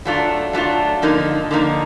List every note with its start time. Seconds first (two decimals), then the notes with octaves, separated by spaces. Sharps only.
0.05 F#3 A3 D4 F4
0.53 F#3 A3 D4 F4
1.02 D3 F3 A#3 D#4
1.51 D3 F3 A#3 D#4